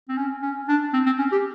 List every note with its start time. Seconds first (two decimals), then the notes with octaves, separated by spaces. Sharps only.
0.09 C4
0.17 C#4
0.42 C#4
0.68 D4
0.93 C4
1.06 C4
1.19 C#4
1.32 G4